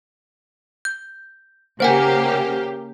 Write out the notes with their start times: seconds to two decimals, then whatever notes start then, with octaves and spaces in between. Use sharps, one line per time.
0.85 G6
1.80 C#3 A#3 G4 C5 F#5 G#5